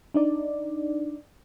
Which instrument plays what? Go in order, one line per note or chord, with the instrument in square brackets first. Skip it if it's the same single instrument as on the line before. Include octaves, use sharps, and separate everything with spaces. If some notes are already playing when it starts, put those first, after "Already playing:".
[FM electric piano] D4 D#4 D5